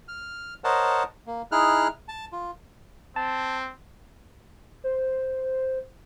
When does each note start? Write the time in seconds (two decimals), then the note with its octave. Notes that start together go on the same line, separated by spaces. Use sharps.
0.08 F6
0.64 A#4 C5 C#5 D#5 F#5 A5
1.27 A#3
1.52 D#4 E4 G#4 F6 F#6
2.08 A5
2.32 F4
3.16 C4 A5
4.84 C5